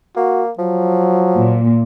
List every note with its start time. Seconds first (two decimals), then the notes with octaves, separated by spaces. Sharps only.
0.16 A#3 F#4
0.59 F3 F#3
1.37 A#2